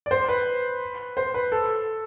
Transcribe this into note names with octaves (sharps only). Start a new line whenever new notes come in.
D5
C5
B4
C5
B4
A4